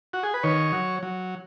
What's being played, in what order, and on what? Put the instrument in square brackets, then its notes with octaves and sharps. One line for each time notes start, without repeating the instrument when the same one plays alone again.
[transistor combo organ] F#4
G#4
B4
D#3 C#5
F#3
F#3